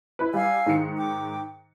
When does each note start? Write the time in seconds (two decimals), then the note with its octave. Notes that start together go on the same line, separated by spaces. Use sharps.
0.19 E4 B4
0.33 G3 F5 G#5 E6
0.66 G#2 D#3 C#7
0.97 G5 D6